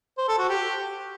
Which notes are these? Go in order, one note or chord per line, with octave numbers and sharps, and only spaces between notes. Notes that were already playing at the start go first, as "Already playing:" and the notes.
C5
A4
F#4
G4